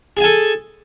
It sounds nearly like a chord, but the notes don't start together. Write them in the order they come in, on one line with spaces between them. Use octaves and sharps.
G#4 G#5 A4